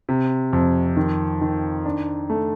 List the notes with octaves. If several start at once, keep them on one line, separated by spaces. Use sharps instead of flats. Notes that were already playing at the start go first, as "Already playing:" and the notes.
C3
F2
D#3
D#3
D4
A3